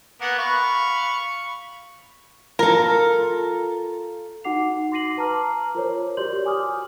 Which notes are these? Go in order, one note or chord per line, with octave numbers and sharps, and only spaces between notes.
A#3 B3 F#5
F5 B5 C#6
F4 A4 A#4
D#4 F#4 F#5 D6 C7 F7
C6 D6 A#6 C7 D#7 F#7
B4 A5 A#5 D6 F6
F4 A#4 C5 C#5
F#4 G4 D5 C6 G6 F#7
G#5 D6 D#6 F6